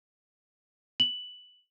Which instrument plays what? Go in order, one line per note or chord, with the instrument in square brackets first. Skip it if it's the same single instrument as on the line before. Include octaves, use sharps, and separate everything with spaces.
[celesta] F#7